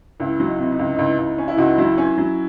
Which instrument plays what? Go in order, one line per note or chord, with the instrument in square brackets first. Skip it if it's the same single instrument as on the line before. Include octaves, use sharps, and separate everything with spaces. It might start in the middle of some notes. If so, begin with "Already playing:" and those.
[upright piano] C#2 [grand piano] E4
[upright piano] F#3
[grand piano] D#4
[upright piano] C3
[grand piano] D#4
[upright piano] C#2
[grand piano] D#4
[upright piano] C#2 [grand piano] E4
[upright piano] C#2 [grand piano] D#4
[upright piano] C#4
[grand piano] E4
[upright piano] C#2 [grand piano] D#4 F#4
[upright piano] F#3 [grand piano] E4
[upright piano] C#4
F#3